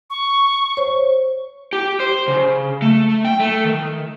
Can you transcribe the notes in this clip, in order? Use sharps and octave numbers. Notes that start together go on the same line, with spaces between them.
C#6
C5 C#5
G4
C5
C#3
A3
G5
A3
D#3